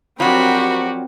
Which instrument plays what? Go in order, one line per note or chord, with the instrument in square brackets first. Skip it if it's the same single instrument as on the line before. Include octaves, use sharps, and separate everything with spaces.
[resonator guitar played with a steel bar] F3 F#3 D4 [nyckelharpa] C4 [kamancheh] F#4 G4 [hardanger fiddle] A#4 B5